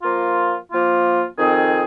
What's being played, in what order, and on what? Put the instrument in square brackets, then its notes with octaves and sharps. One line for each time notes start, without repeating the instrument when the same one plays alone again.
[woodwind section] F3 A#3 F4
F3 A#3 F4
F2 D#3 C4 G#4